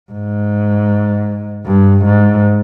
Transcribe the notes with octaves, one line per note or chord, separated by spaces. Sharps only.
G#2
G2
G#2